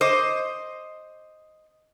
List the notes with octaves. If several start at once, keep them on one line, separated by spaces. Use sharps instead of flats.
C5 D#5 D6